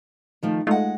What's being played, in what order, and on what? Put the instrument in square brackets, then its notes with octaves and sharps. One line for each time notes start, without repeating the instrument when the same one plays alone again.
[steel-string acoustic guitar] D#3 F3 A3
[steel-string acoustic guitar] G#3 F#5 [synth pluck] A3 D#4 F4